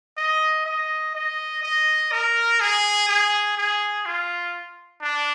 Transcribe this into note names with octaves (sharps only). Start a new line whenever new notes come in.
D#5
D#5
D#5
D#5
A#4
G#4
G#4
G#4
F4
D4